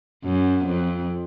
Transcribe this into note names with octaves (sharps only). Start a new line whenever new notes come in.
F#2
F2